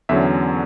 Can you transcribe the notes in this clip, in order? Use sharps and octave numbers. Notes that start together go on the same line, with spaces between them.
E2 D3 F#3 C#4 E5